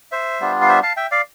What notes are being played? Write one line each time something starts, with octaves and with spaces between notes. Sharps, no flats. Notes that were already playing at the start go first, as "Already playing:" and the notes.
C5 E5
G3 B3 D4 F4
F5
C5 E5
F5 A5
E5 G5
D5 F5